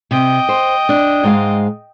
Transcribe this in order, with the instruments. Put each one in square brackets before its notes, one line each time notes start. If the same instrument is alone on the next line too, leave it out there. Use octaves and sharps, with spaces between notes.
[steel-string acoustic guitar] C3 [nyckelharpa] D#5 G5
[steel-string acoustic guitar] C5
D4
G#2 G#3 F5